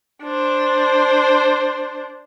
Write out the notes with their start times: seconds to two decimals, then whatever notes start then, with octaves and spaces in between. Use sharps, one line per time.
0.23 D4 C5